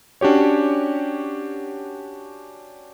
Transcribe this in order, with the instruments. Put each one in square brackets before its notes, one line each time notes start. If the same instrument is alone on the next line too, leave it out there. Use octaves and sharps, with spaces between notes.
[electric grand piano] C#4 D4 F#4 G4 C#5